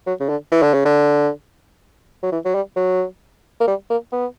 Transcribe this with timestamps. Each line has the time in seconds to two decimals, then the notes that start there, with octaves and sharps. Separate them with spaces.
0.06 F#3
0.20 C#3
0.29 D3
0.51 E3
0.62 D3
0.74 C#3
0.85 D3
2.23 F#3
2.32 E3
2.45 F#3
2.54 G3
2.76 F#3
3.60 A#3
3.67 G3
3.90 A#3
4.12 B3